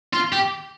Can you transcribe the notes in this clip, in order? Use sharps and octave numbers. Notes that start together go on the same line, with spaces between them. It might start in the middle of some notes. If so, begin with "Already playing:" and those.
F4
G4